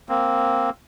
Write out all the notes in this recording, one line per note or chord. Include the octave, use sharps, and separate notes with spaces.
A#3 C4